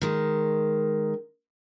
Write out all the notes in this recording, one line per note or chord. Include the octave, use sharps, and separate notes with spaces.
D#3 G#3